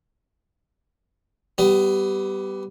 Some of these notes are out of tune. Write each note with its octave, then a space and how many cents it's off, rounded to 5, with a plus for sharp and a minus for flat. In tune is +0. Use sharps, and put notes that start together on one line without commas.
G3 -10 B3 +15